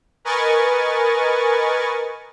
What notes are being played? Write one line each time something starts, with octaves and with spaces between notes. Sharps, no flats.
A#4 B4 D#5 G#5 C#6 A6